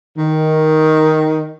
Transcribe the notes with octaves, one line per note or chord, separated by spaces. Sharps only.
D#3